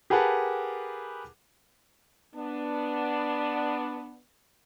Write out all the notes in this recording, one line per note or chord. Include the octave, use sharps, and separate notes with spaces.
G4 G#4 A#4 B4 F#5 A5
B3 D4